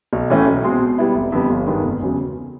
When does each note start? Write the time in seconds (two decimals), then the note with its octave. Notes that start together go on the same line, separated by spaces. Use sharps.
0.13 B1
0.30 A2 E3 A3 C#4
0.47 B1
0.64 B2 G#3 C4
0.81 B2
0.98 G3 B3 E4
1.15 F1
1.32 F2 D3 G3 B3
1.50 G1
1.66 G2 D#3 G#3 B3
1.83 F1
2.01 E2 C#3 F#3